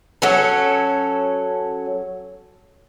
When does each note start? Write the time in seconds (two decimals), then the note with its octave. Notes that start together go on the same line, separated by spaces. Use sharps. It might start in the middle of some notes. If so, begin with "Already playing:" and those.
0.22 F#3 C#4 A4